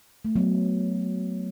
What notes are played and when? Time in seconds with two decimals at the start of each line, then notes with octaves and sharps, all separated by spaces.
0.25 A3
0.36 F#3 B3